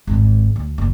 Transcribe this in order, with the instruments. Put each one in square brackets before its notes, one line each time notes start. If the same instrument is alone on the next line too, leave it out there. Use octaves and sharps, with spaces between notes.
[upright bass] G#1 E2
D2
F#1 B1